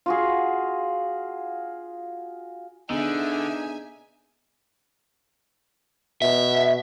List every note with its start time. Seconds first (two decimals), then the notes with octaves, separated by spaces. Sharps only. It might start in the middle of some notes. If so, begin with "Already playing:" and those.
0.06 F4 F#4 G#4
2.90 D3 B3 D4 D#4 G#4 E5 G#5
6.22 B2 E5